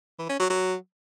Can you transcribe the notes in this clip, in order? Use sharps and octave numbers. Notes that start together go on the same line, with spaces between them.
E3
C#4
F#3
F#3